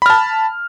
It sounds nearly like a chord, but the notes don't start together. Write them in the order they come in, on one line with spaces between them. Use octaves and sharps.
B5 F6 A5